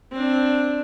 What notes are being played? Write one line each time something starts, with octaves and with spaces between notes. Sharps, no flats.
C4 D4